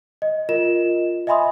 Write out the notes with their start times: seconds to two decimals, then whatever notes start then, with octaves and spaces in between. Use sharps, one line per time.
0.22 D#5
0.49 F4 A#4 D#5 E7
1.27 D#5 E5 G#5 B5 C6 D#6